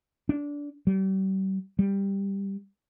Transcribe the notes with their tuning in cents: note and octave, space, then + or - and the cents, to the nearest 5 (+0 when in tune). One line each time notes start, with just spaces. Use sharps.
D4 -20
G3 -40
G3 +10